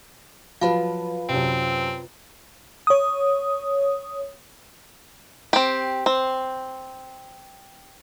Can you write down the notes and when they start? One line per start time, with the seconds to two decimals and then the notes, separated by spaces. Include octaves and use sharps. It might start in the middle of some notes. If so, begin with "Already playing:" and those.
0.61 F3 F#3 F4 B4 F5 A5 B5
1.29 F#2 C3 C4
2.87 C#5 D#6
5.53 C4 G4
6.06 C4